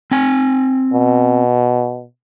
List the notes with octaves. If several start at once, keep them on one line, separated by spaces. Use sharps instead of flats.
C4 G#5
B2